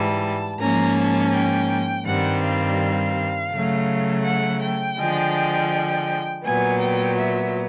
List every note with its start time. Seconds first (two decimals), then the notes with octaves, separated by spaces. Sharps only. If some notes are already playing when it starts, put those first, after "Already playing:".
Already playing: G#2 E3 G3 A5
0.60 G#2 F3 A#3 C#4 A#5
0.97 A5
1.34 G5
2.06 G2 D#3 G3 C4 F#5
2.43 F5
3.52 C#3 F#3 A3
4.25 F#5
4.62 G5
4.99 D3 F3 G#3
6.44 A#2 F#3 B3 G#5
6.81 G5
7.18 E5